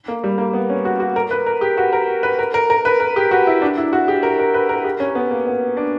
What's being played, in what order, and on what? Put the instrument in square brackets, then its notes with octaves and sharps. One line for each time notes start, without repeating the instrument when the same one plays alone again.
[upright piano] A#3
G3
A#3
B3
C#4
F#4
F#4
A#4
B4
A#4
G4
F#4
A#4
B4
A#4
A#4
A#4
B4
A#4
G4
F#4
E4
D4
E4
F#4
G4
A#4
A#4
B4
A#4
G4
C#4
B3
A#3
B3
D4